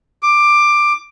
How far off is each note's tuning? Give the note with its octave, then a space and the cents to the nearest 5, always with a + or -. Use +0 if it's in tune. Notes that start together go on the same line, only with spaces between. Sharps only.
D6 +10